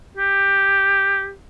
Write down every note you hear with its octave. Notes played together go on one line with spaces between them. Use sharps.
G4